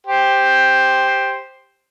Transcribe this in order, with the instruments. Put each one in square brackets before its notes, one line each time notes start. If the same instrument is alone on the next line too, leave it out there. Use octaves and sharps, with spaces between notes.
[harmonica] G4 C5